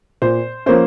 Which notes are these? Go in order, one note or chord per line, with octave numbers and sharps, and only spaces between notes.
A#2 C5
F3 A#3 C#4 C5